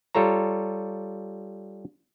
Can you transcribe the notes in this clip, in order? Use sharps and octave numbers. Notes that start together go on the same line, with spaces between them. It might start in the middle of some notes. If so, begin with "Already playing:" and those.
G3 F4 A4 C#5 A#5